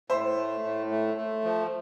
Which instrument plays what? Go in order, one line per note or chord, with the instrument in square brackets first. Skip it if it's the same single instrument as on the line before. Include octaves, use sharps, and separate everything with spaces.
[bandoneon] A2 [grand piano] C5 E5
[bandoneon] A3
A2
A3
A3
F3